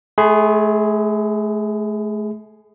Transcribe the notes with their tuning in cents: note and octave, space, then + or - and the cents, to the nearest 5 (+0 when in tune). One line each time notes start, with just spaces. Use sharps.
A3 -35 G#4 +0 B5 +40